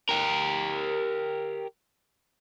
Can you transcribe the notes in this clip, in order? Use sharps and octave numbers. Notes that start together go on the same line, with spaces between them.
G4 A#4